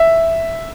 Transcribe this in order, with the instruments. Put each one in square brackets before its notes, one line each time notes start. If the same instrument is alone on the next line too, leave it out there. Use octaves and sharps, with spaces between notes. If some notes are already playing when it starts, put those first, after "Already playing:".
Already playing: [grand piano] E5